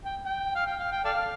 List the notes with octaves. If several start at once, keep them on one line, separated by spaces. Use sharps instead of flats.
G5
G5
F5
G5
F5
G5
A4 D5 F5